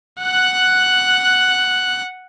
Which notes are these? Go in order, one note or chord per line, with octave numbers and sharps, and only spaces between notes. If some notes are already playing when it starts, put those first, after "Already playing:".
F#5 F#6